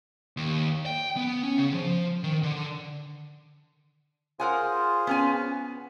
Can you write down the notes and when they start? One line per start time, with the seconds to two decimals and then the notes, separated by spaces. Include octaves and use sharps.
0.37 D#2
0.86 G5
1.17 B3
1.44 C#4
1.58 C#3
1.74 F3
2.23 D#3
2.43 D3
4.40 F4 G#4 A#4 C5 F#5 G#5
5.07 B3 C#4 G#5